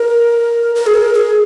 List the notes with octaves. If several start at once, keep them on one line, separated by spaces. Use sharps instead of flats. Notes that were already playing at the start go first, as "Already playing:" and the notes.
Already playing: A#4
A#4
G#4
A#4
G#4